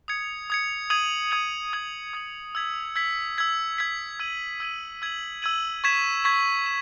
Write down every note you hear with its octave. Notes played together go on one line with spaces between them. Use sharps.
D#6 G#6 C#7
D#6 G#6 C#7
D#6 G#6 D#7 F#7
D#6 G#6 D#7 F#7
D#6 G#6 D#7 F#7
D#6 G#6 D#7 F#7
E6 G#6 B6
E6 G#6 B6
E6 G#6 B6
E6 G#6 B6
E6 G#6 D#7 F#7
E6 G#6 D#7 F#7
E6 G#6 D#7 F#7
E6 G#6 D#7 F#7
C#6 G#6 B6 E7
C#6 G#6 B6 E7
E7